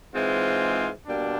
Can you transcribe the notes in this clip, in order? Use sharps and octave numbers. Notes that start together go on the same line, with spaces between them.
G#2 E3 G#3 C4 F4
B2 G3 A#3 D4